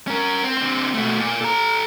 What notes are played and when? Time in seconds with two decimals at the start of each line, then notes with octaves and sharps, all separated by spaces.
0.07 C#4 A#4
0.44 C4
0.58 D3 C4
0.94 B2 A3
1.20 A#2
1.41 A4 A#5